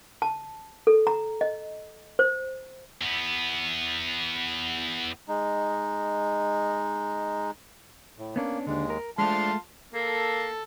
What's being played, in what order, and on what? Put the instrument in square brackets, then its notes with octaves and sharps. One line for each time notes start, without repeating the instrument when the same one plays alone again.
[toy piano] A5
A4
A#5
D#5
C5
[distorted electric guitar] E2 B3
[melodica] G#3 D#4
[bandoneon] A2
[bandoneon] A#3 [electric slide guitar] B3 C#4 D4
[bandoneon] D#2 G#3 [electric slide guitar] D3 D4
[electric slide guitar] A#4
[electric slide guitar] G#3 A3 [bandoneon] D4 F6 [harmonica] F4 A5 C6
[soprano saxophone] A#3 [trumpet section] A4